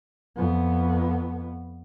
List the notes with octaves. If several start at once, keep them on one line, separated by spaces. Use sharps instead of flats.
F2 B3